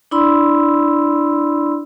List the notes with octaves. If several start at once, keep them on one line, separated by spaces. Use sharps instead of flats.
D4 E4 D5 B5 C6 E6